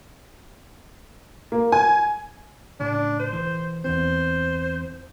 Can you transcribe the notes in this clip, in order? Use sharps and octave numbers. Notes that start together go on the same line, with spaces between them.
A#3
G#5
A2 C#3 D4
C5
B1 E3
E2 E3 C4 C5